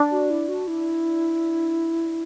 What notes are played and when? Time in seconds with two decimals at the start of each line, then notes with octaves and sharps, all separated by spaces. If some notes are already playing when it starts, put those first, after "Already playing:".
Already playing: D4
0.11 F#4
0.30 E4
0.48 F#4
0.68 E4